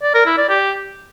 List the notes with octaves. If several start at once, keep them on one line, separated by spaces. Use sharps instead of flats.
D5
A#4
E4
D5
G4